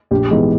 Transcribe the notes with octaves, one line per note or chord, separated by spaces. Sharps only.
A#1 G4
G#2 E3 G#3 B3